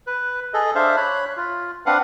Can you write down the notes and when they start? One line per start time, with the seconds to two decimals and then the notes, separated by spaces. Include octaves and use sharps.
0.07 B4
0.54 G#4 A4 D#5
0.75 D4 C5 E5 F5
0.97 C#5 B5 F#6
1.37 F4
1.86 C4 D4 B4 F5 F#5